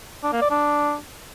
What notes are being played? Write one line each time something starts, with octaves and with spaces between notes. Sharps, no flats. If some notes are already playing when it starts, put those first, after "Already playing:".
D4
A#3
D5
D4